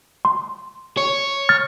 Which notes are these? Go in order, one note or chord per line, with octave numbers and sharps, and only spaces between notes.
C6
C#5
F6 A6